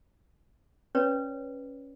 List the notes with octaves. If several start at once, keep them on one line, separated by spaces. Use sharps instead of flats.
C#4 B4 C#5 D5